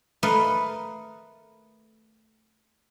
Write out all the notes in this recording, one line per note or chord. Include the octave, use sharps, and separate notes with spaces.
A3 A#4 B4 D#5 F5